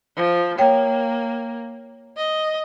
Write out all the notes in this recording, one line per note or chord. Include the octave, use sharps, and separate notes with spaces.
F3
A#3 C#5 G5
D#5